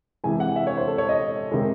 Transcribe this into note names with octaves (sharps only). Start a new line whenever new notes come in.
C3 E3 G#3 G#5
F#5
E5
C#5
C5
A4
C#5
D#5
C3 D#3 G#3